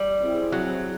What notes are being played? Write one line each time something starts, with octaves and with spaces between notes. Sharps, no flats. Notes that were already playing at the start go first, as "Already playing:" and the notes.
Already playing: G3
C4 E4 G#4
F#3